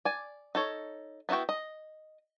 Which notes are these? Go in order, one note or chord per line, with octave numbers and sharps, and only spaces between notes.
D5 G#5
D#4 A4 C#5
B3 D#4 E4 F#4 G5
D#5